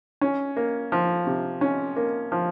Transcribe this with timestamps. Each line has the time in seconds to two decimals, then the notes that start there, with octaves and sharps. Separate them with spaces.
0.21 C#4
0.57 A#3
0.92 F3
1.27 C3
1.61 C#4
1.97 A#3
2.32 F3